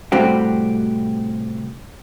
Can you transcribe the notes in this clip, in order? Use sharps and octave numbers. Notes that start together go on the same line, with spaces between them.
A2 C3 G3 C4 F#4 G4